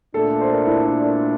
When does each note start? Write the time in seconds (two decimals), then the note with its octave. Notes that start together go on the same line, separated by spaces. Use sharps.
0.14 A#2 A3 D4 A4
0.41 C5
0.52 A#4
0.66 E4